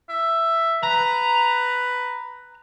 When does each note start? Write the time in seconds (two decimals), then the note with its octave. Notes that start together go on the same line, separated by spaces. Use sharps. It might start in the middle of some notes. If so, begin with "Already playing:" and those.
0.09 E5
0.83 B4 A#5